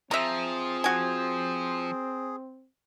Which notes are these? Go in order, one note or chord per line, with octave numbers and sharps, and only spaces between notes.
F3 C4 G#4 E5 A#5
F#4 G#5